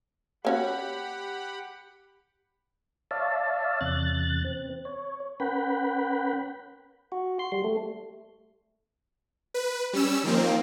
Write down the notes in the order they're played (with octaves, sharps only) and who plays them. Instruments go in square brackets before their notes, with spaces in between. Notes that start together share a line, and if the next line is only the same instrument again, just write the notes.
[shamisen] A#3 C#4 F#4 [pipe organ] G4 F#5 B5
[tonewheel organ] C#5 D5 E5 F5 A5
E2 C3 F#6 A6
C4
C#5
C#4 A#4 B4 F#5 G5 B5
F#4
C6
G3
A3
[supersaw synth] B4
G3 C#4 E6
D#3 F3 A#3 C4